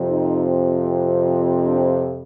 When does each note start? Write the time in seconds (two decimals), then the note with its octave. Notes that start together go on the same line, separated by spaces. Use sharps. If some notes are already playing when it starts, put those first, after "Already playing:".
Already playing: F2 C3 F3 C4
0.09 D#4
1.66 D4